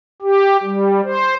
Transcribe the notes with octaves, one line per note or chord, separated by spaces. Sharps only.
G4
G3
C5